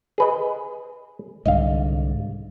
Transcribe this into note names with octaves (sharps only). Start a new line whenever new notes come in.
G#4 B4 D#5
C2 G#2 D3 D#5 F5